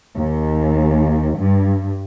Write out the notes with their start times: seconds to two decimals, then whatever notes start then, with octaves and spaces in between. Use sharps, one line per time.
0.15 D#2
1.38 G2